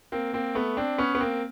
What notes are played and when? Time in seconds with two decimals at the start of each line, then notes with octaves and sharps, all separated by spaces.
0.12 A#3 C4
0.33 A#3 C4
0.55 A3 B3
0.77 C4 D4
0.98 B3 C#4
1.15 B3
1.21 A#3 C4